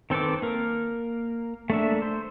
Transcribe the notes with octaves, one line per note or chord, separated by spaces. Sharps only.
D#3 C4 A4 B4 D6
A#3 A#4
A3 A#3 D4 E5
C5